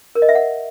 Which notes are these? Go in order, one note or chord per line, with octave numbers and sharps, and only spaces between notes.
A#4
D#5
E5
F#5